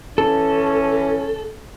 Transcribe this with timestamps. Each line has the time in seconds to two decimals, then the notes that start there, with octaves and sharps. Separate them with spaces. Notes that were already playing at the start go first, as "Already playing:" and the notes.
0.18 E3 C#4 A4